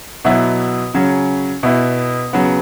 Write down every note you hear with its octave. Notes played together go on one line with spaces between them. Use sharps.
B2 F#3 B3 E4
C#3 F#3 C#4
B2 B3 E4
C#3 F#3 B3